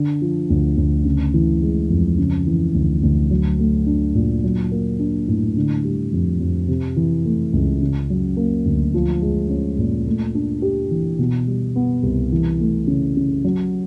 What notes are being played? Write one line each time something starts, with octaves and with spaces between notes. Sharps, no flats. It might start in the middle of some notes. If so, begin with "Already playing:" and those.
Already playing: D3
F3
D2
D2
C#3
E3
G#3
F2
C#3
E3
D2
D2
F#3
A3
D4
A#2
F#3
A#3
D4
A2
D3
G3
F2
F2
C3
E3
A3
C#2
C#3
F#3
A#3
D2
F3
G#3
C#4
A#2
A3
D4
G4
E3
B2
G3
B3
C2
E3
A3
C#3
C#3
F#3